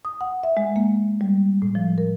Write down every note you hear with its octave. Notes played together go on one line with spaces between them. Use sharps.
D#6
F#5
E5
G#3
A#3
G3
A2
F3
A#4